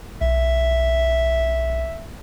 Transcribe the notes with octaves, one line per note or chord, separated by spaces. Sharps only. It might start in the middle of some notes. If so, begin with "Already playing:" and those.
B1 E5